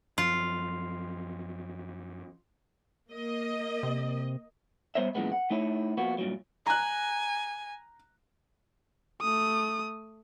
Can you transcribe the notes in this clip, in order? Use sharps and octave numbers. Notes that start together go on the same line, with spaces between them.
F#2 F3 F4
A#3 D#5
C3
G3 B3 C5 C#5 E5
F#2 A#2 E3 G#3 B3
F#5
A3 D#4 E4 C#5
F3 A#3 B3 F#4
G2 A#2 F#3
G#5 A#5 F#6
A3 D#6